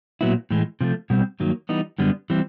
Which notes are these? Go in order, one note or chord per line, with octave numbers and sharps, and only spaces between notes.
A#2 F#3 B3 E4
A2 E3 G#3
C3 F3 A3
B2 G3 C4
G2 D#3 F#3 A#3
E3 G3 B3 D#4
F#2 D3 G3 B3 D4
E3 G3 C4